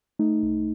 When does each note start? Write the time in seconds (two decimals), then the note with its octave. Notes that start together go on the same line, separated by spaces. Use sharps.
0.19 A3 D#4
0.43 C2